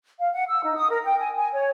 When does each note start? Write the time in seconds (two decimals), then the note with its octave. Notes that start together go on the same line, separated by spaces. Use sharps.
0.19 F5
0.33 F#5
0.49 E6
0.64 D#4
0.76 D#6
0.90 A#4
1.04 G5
1.19 G#5
1.37 G#5
1.54 C#5